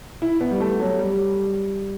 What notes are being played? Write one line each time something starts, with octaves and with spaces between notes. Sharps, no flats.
E4
B3
G3
A3
F#3
G3